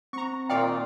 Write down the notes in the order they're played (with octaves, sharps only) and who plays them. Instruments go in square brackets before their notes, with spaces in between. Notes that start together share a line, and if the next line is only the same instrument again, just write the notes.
[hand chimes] C4 [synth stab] A#5 C#6
[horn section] A#2 D#3 [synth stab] D5 F5 [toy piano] G5